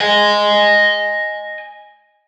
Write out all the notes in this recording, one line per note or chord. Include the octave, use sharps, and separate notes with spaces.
D#5 G#5